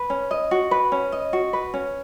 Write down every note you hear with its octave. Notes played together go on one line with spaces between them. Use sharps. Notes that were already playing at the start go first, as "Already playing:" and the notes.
Already playing: B4
C#4
D#5
F#4
B4
C#4
D#5
F#4
B4
C#4